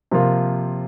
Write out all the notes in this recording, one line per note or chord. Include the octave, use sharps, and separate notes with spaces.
C3 F3 A#3 F4